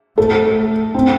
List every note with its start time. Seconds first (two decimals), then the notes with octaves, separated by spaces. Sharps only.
0.18 A3 A4
0.94 C4